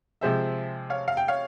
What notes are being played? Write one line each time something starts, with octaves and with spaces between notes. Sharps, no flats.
C3 F3 G#3 C5 E5
C#5 F5
F5
G5
C#5 F5